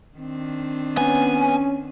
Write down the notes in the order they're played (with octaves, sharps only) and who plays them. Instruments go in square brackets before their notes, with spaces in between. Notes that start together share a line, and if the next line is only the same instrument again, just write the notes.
[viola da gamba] D#3 C4 D4
[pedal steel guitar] B3 [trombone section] C#4 [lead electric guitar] G#5